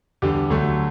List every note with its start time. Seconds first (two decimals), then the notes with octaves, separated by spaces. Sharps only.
0.22 E2 D3 G3 G4
0.50 D2 D3 F#3 A3